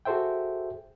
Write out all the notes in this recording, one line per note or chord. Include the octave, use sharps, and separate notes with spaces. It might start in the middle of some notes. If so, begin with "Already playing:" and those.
F#4 G#4 A4 C5 E5 G5